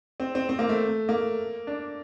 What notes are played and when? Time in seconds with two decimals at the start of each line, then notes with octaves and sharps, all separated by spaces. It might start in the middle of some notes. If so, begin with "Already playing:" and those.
0.20 C4
0.35 C4
0.49 C4
0.59 A#3
0.69 A3
1.09 A#3
1.67 D4